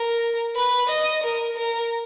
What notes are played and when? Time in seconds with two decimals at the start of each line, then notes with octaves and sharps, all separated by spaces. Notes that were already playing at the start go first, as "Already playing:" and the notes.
Already playing: A#4
0.55 B4
0.89 D#5
1.23 A#4
1.56 A#4